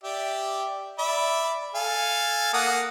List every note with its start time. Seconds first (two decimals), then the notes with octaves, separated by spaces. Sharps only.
0.04 G4 D5 E5
0.99 D5 E5 B5
1.75 A4 F5 G#5
2.53 A#3 F#5 D#6